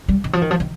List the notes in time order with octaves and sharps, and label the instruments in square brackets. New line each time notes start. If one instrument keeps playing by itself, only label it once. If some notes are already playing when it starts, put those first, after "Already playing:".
[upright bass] G3
D#3
F3
D#3
F3
D#3